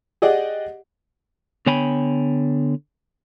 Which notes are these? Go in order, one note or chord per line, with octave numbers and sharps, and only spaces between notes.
G4 G#4 D5 D#5 F#5
D3 B3 C#5 G5 G#5 B5